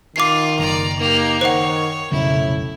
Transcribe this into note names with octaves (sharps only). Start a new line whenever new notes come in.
D#3 F4 D6 C7
F#1 D5 A#5
A#3 D#4 G4
D#3 C5 C#5 F#5
F1 B1 A2 C#3 E4